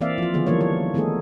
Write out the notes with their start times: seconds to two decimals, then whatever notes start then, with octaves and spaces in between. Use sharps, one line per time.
0.01 E3 A#3 C4 D5 E5 F5
0.18 F3 F4
0.34 D3 D#3 F3 B3 G#4
0.46 E3 F3 G3 A#3 D4 C#5
0.61 C#5
0.94 D#3 A3 B3 D#4 G#4 A4